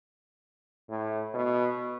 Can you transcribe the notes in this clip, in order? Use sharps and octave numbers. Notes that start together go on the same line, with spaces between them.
A2
B2